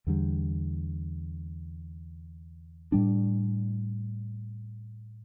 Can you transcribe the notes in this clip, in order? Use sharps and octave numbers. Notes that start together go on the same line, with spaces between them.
E2 D3 G3
A2 G3 D4